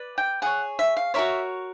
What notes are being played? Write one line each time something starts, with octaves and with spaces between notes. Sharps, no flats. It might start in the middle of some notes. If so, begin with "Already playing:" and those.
Already playing: B4 D5
G5
G#4 C#5 F#5
E5
F5
F#4 A#4 C#5 E5